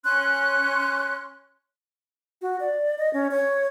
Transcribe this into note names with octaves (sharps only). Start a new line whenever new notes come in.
C#4 C6 F#6
F#4
D5
D#5
C#4
C#5